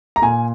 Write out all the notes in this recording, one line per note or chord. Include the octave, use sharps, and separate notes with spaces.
A#5
A#2 G#5